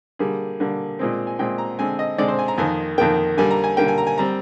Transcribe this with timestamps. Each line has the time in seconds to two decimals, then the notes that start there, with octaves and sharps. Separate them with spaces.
0.19 D3 G3 A#3 G#4
0.60 D3 G3 A#3
0.99 A#2 G#3 C4
1.27 G#5
1.39 A#2 G#3 C4 G5
1.58 A#5
1.79 D3 G#3 C4 G#5
1.99 D#5
2.18 D3 G#3 C4 D5
2.28 C5
2.39 G#5
2.48 A#5
2.58 F2 D#3 A#3 G#5
2.98 F2 D#3 A#3 G5
3.37 D3 G3 A#3 G#5
3.51 A#5
3.64 G#5
3.77 D3 G3 A#3 G5
3.88 G#5
3.98 A#5
4.07 G#5
4.18 G3 C4 A#5